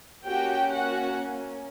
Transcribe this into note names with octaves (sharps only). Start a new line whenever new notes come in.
A#3 C#4 F#4 G4 G5
F#4 F#5